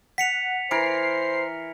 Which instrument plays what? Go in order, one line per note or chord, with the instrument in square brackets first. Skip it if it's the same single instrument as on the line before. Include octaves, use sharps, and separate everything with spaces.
[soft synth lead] F#5 [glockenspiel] B6 C#7 F7
[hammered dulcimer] E3 A#4 [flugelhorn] C5 [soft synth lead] C7